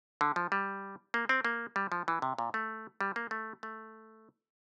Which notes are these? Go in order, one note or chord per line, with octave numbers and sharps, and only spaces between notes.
D3
F3
G3
A#3
C4
A#3
G3
F3
E3
C3
A#2
A3
G3
A#3
A3
A3